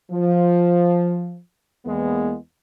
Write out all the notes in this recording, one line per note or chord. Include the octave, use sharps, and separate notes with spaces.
F3
E2 G#3 A#3 B3